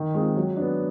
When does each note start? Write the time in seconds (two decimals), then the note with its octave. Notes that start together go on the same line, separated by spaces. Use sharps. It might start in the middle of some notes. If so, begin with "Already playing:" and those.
Already playing: D#3
0.14 G#3 C4 F4
0.36 F#3
0.57 B3 D4